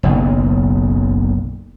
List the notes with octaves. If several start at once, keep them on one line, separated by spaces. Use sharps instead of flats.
F#1 B1